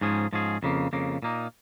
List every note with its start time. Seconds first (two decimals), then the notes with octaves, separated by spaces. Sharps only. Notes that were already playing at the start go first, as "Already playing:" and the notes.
0.01 G#2 F3 C#4 G#4
0.33 G#2 F3 C#4 G#4
0.63 F2 C#3 A#3
0.93 F2 C#3 A#3
1.23 A#2 A#3 D#4